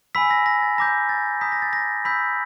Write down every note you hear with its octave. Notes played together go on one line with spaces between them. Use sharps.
G#5 B5 E6 B6
A#6
A#6
A6
A#5 D6 G6 A#6
A6
A#5 D#6 G6 B6
A#6
A6
A#6
B5 E6 G6 B6